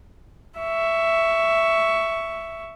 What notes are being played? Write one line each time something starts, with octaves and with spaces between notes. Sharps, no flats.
E5 C#6